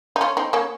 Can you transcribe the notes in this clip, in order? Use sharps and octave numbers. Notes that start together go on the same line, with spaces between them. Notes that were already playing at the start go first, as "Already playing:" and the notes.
D#4
C#4 F4
C4 D#4
A#3 C#4